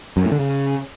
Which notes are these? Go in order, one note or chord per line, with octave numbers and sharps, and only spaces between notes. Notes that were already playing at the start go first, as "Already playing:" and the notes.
F#2
A2
D3
C#3